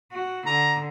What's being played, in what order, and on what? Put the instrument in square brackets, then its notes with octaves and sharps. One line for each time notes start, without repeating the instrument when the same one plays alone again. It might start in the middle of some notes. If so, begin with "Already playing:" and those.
[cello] F#4
[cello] D3 [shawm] A#5